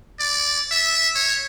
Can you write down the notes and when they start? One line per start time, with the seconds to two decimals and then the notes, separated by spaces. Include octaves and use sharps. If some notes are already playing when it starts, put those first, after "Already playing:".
0.19 D5
0.71 E5
1.15 C#5